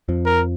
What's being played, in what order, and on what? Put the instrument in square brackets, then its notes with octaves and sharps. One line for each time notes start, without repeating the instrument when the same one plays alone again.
[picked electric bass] F2 F3
[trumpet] A#4